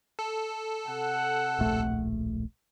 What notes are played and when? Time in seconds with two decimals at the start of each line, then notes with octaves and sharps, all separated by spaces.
0.19 A4
0.86 C3 F#5
1.59 D1 A#1 A3